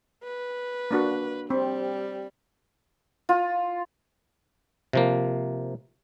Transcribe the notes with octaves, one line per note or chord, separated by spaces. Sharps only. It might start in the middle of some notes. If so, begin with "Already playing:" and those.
B4
A#3 D4 F#4
G3 C4
F4
C3 F3 A#3